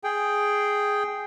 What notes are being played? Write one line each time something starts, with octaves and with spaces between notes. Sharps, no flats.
G#4 G5